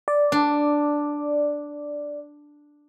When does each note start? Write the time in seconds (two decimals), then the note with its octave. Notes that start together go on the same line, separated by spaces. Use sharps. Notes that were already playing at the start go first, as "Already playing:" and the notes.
0.08 D5
0.32 D4